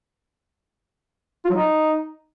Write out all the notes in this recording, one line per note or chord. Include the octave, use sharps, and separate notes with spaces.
F4
F#3
D#4